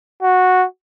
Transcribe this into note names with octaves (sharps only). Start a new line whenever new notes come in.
F#4